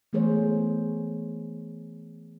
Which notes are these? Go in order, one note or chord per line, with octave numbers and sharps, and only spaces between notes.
E3 A3 B3 G#4 C5 C#5